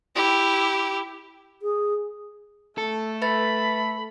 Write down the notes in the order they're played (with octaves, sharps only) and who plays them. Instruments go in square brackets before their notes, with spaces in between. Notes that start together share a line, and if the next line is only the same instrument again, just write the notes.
[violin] E4 G4
[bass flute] G#4
[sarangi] A3 [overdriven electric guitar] A4
[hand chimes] B4 E5 A6 [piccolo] B5